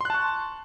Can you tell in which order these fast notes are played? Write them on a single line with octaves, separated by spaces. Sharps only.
C6 F#6 A5 C#6